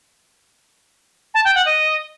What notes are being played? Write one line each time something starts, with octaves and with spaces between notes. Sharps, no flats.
A5
G5
F#5
D#5